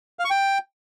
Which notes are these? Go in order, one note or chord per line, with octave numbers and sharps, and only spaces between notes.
F5
C#6
G5